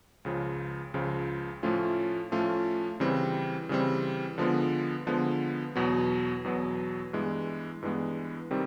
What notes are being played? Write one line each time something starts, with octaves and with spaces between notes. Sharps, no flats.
C#2 C#3 F3
C#2 C#3 F3
A2 F3 A3 C#4 F4
A2 F3 A3 C#4 F4
C#3 E3 G3 C4
C#3 E3 G3 C4
D3 F3 G#3 B3
D3 F3 G#3 B3
E2 B2 F#3 B3
E2 B2 F#3 B3
G2 E3 G#3 B3
G2 E3 G#3 B3
C3 D#3 G3 C4